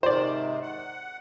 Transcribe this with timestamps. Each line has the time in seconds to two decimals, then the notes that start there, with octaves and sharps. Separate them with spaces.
0.03 G#2 C3 D#3 C5 D5
0.62 F#5